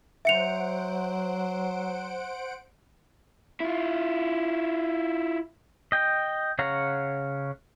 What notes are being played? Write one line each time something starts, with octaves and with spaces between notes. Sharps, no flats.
F#3 C5 E5 F#5 C#7 D7 F7
E4 F4
D#5 G5
C#3 C#5 F5 F#5 A#5